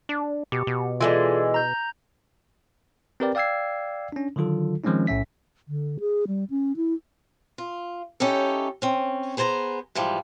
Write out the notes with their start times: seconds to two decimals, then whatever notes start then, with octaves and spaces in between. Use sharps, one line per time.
0.09 D4
0.52 B2 G4
0.67 B2
1.01 E3 G3 G#3 F4 A4 D5
1.54 A#5 G6
3.20 C4 G4 A#4 B4 D5 G5
3.35 D5 F5 G5 E6 G#6 C7
4.12 C#4 D4
4.36 D3 D#3 F#3 F4 A4
4.84 D#3 F3 G#3 C4 C#4 D#4
5.07 B1 A2 C#4 E5 B6
5.68 D3
6.00 G#4
6.27 G3
6.50 C#4
6.76 E4
7.58 F4
8.20 C#4 D#4 E4 G4 A4
8.82 C4 C#4
9.37 B3 G#4 C5 A5 A#5
9.95 G#2 E3 F3 G3